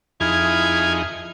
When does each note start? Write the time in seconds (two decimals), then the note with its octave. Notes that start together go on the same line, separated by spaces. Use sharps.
0.20 F2 D#4 E4 G#4 F6 G#6